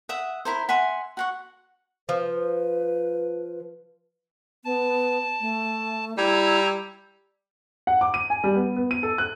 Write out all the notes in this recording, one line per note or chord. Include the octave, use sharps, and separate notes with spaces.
E5 F#5 D#6
E4 A#4 C5
E5 F#5 G#5 C6
F#4 F#5 C#6
F3 B4
B3 A5
A3
G3 E4 A#5 E6 G#6
F#5
D6
D#7
G#5
G3
B3
B3
D#7
A4
F#6